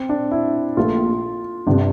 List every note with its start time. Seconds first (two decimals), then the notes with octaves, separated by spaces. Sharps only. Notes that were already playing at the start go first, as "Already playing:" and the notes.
Already playing: C4
0.09 D4
0.31 E4
0.77 A#1 A#2 A3 F4
1.66 G1 C3 D4